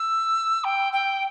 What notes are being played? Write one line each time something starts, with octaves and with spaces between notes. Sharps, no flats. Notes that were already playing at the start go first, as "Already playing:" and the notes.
Already playing: E6
G5
G5